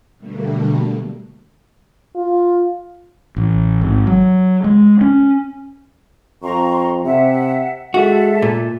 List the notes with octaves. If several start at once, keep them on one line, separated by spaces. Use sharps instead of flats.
B2 D3 G3 A3 A#3
F4
A1
G#1
F#3
G#3
C#4
F2 A#5 C6 C#6
C3 E5 F#5
G#3 F#4 A4 E5
A#2